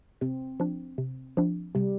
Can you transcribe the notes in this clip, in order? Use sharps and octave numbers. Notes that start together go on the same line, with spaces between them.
C3 C4
F3 D4
C3
F3 D4
C3 G3